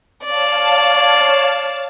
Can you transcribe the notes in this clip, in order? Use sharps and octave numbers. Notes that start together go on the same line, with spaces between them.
C#5 D5 F5 A5